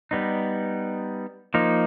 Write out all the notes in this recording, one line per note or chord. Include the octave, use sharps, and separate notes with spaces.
G3 B3 D#4
F3 A#3 D#4